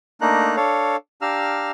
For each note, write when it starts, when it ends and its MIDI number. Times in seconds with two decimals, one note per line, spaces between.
0.21 0.56 57
0.21 0.56 58
0.21 0.56 62
0.21 0.56 63
0.21 0.56 82
0.21 0.56 90
0.56 0.96 62
0.56 0.96 69
0.56 0.96 73
0.56 0.96 77
1.22 1.72 62
1.22 1.72 67
1.22 1.72 77
1.22 1.72 82
1.22 1.72 88
1.22 1.72 89